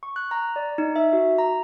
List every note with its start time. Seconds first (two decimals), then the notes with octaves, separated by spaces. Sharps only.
0.03 C#6
0.16 F#6
0.31 A#5
0.56 D5
0.78 D#4
0.96 E5
1.13 F#4
1.38 A#5